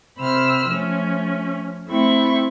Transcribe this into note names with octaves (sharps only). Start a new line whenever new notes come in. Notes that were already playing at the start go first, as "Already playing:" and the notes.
C3 C5 B5 E6 F6
F3 A3 C#4
A3 C4 E4 B5 C#6